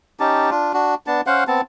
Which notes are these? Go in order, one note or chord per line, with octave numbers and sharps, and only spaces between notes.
C#4 D#4 G4 A5
D4 F4
D4 F#4
B3 D4 A5
C#4 C5 F5 F#5
B3 C4 A5